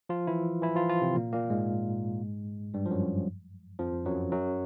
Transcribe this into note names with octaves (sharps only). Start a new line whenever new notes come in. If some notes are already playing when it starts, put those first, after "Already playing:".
F3 F4
E3 E4
E3 E4
F3 F4
F3 F4
C3 C4
A#2 A#3
A#2 A#3
G#2 G#3
G2 G3
F3
F#2 F#3
F2 F3
F#2 F#3
F#2 F#3